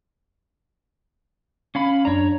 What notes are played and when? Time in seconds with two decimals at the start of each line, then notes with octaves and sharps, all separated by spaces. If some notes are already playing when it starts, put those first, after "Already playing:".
1.75 C#4 F5 B5
2.05 F#2 D4 C#5 A#5